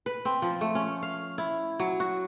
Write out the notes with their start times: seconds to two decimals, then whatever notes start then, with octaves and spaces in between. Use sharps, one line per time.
0.06 B4
0.25 C4
0.42 F3
0.61 A3
0.75 C#4
1.03 F5
1.38 E4
1.79 F#3
2.00 F#4